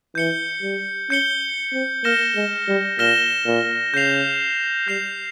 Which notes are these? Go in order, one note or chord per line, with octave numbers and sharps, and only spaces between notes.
E3 G6 C#7 G7
G3
C#4 G6 C#7 G7
C4
A#3 F6 A#6 E7 G7
G#3
G3
A#2 F6 A#6 E7 G7
A#2
C#3 G6 C7 F7
G3 G6 C7 F7